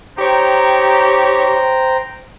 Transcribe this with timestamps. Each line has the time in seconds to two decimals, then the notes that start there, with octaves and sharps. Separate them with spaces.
0.18 D#4 G4 C5 C#5 G5 A#5